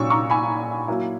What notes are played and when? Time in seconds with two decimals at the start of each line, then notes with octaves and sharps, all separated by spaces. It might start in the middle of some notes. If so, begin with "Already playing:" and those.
Already playing: A#2 F#3 C#4 C#6 E6
0.10 A#5 C#6
0.30 G#5 B5
0.88 F#3 A#3 E4